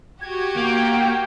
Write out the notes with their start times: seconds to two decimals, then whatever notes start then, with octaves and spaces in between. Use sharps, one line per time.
0.22 F#4 G4 G#6
0.56 A#3 G5